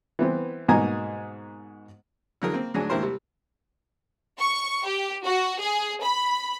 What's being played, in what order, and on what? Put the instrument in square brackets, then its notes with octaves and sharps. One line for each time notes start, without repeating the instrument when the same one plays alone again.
[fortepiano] E3 B3 C4
G#2 B2 A#3 D#4 G#5 A#5
D3 E3 F#3 G#4 A#4
A#3 C4
D2 G#2 F#3 G#3 D4 G#5
D#2 G#2 E4 G4 A#4 C5
C3 G3
[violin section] C#6
G4
F#4
G#4
B5